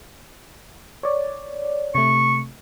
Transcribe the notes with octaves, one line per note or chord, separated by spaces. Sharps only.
C#5 D5
C3 A3 C#6